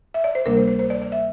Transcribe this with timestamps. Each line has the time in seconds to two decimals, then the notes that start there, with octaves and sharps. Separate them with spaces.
0.14 E5
0.24 D5
0.35 C5
0.46 D2 C3 G3 A#3 D4 A#4
0.57 C5
0.68 C5
0.79 C5
0.90 D5
1.02 D5
1.12 E5